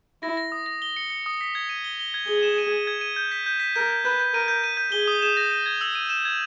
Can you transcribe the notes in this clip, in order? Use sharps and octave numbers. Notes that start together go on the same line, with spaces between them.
E4 A#6
A#6
D#6
A#6
G7
C#7
C#7
D#6
B6
G#6
D#7
G7
G7
G#6
G#4 G7
E7
D#7
D#7
G#6
D#7
G6
B6
G6
B6
A#4 G6
G6
B4 G6
G6
A#4 D#7
G6
D#7
G6
G#4 G7
D#6
E7
A#6
D#7
G#6
E6
D#7
E7
G#6